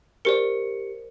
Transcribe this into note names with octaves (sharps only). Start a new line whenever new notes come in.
G4 A#4 C5 D5 C#7